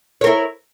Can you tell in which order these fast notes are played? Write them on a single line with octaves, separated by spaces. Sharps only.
C#5 A#4 E4